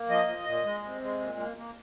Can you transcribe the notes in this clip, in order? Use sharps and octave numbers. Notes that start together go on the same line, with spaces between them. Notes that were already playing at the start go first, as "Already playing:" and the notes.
Already playing: A#3
F3 D#5
F3
A#2
G#3
C3
G#3
A#2
A#3
A#3